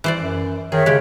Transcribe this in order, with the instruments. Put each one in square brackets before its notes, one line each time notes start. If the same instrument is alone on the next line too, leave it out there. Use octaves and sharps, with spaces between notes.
[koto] E3 C5 D5
[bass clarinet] F#2
[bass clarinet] D#3 [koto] G#4 [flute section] C#5 E5
[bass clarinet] C#3 [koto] G#3 G4